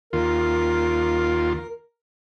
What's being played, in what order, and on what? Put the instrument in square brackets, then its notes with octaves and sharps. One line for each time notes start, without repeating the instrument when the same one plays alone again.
[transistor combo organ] D#2 F4 [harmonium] A#4